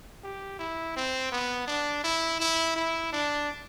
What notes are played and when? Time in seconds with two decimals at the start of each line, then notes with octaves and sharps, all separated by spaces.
0.24 G4
0.59 E4
0.96 C4
1.32 B3
1.67 D4
2.04 E4
2.40 E4
2.76 E4
3.12 D4